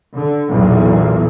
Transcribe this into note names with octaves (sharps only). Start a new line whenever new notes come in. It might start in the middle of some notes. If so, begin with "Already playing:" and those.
D3
B1 E2 A#2